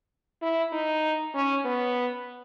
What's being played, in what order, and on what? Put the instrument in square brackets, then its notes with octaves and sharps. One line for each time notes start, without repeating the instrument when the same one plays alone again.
[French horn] E4
D#4
C#4
B3